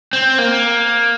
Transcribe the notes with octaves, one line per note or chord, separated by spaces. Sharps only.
C4
A#3